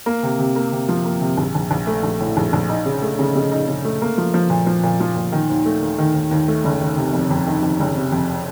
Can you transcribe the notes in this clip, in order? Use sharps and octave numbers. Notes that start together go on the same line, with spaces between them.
A#3
C3
C3
A#3
C3
F3
A#3
C3
A#1
A#1
A#1
A3
A#1
A2
A#1
A#1
D#4
C#3
A3
C#3
C#3
D#4
C#3
A3
A#3
F3
F3
A#2
F3
A#2
F3
A#2
D#3
D#2
A3
D#2
D#3
D#2
D#2
A3
F#1
D#3
C3
F2
F2
D#3
F2
F#1
C3
F2